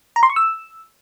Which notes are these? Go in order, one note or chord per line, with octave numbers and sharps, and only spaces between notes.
A#5
C6
C#6
E6